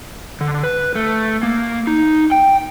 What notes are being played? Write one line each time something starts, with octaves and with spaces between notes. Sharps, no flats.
D3
B4
A3
A#3
D#4
G5